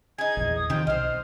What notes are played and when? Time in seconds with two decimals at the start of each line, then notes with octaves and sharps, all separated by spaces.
0.18 D#4 G#4 G#6
0.37 A#1 E2
0.55 D#6
0.70 C3 D#3 F3 D#4 G5
0.87 B1 C5 D#5 F6